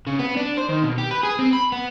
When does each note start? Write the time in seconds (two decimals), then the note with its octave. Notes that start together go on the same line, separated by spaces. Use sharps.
0.07 C#3
0.19 B3
0.37 D4
0.57 C5
0.69 D#3
0.83 B2
0.98 G4
1.11 B4
1.23 G#4
1.39 C4
1.53 B5
1.72 B3